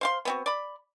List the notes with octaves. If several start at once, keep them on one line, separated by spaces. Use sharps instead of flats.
C5 F5 C6
B3 C4 F#4
D5 B5